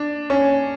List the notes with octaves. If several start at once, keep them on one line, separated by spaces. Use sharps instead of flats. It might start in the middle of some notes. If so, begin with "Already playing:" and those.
Already playing: D4
C#4